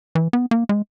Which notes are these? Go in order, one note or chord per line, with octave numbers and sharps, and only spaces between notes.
E3
B3
A#3
G#3